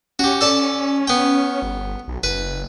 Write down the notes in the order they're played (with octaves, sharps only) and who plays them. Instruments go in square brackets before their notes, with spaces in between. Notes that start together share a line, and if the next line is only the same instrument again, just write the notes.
[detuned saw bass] C#4 [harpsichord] F#4 G4
[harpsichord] A4 D5 A5
B3 G5
[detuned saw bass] G1
B1
[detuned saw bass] F#1 [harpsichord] B4